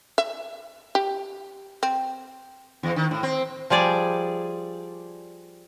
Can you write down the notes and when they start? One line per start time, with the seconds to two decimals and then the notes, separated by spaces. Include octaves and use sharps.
0.18 E5
0.95 G4
1.83 C4
2.83 E2
2.96 D#3
3.11 A2
3.23 C4
3.70 F3 G3 G#4 D5